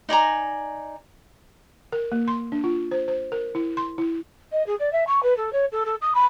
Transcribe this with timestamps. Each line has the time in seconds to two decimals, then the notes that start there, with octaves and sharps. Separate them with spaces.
0.09 D#4 D5 G#5 A#5
1.92 A#4
2.12 A#3
2.28 C6
2.52 D4
2.64 F4
2.91 C5
3.08 C5
3.32 A#4
3.55 E4
3.77 C6
3.98 E4
4.52 D#5
4.67 G#4
4.80 D5
4.92 E5
5.07 C#6
5.23 B4
5.37 A4
5.53 C#5
5.72 A4
5.86 A4
6.02 D#6
6.15 B5